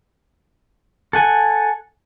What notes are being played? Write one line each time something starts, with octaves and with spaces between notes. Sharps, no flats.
A4 F#5 G#5